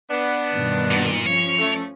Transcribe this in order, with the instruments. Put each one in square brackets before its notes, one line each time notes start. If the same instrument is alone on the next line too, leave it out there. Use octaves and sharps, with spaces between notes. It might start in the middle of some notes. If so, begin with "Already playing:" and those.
[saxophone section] B3 D4
[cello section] G2 B2 D#3
[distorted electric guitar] A#2
[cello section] F3 C#4 [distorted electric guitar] C#5
[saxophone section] A3